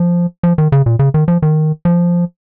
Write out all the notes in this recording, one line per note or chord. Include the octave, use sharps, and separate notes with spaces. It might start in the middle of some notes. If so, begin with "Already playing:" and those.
Already playing: F3
F3
D#3
C#3
A#2
C#3
D#3
F3
D#3
F3